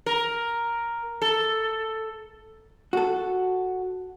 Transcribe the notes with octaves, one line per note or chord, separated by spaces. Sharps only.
A#4
A4
F#4 A4